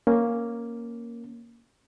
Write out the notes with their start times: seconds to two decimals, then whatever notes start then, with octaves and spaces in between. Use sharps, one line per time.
0.07 A#3 C#4